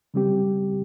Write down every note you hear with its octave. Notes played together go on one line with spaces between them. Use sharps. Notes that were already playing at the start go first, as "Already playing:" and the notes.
C#3 G3 C4 G4